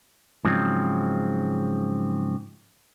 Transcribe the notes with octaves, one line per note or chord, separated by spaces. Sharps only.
G#2 C#3 F3 F#3 C4